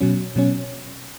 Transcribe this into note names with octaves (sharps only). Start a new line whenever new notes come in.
B2 F#3 C#4
B2 F#3 C#4